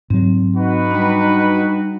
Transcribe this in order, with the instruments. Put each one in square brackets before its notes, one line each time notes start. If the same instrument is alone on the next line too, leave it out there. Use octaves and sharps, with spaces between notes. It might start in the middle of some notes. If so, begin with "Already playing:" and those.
[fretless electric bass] G#2 F#3 [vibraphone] C4
[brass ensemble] D#4 F#4 B4
[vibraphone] G3 D4